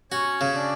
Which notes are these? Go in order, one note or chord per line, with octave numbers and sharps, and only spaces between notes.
C#4 F#4 C#5
C#3
D4 D5